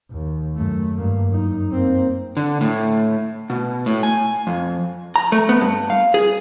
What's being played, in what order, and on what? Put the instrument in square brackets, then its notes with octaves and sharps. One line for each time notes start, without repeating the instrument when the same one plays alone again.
[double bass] D#2
F#2 A3
G2 A#3
F#2 D#4
A#3 C4
[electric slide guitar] D3
A2
B2
A2
G#5
F2
[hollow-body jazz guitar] A#5
A3
B3
G2
F5
G#4